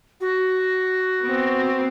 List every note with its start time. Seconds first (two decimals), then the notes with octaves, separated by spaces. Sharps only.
0.21 F#4
1.22 B3 C4